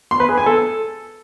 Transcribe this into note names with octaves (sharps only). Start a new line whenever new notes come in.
C6
B4
G#4
G#5
A4